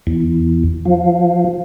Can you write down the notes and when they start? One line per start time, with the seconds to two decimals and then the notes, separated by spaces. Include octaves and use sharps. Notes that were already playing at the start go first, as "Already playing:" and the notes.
0.07 E2
0.85 F3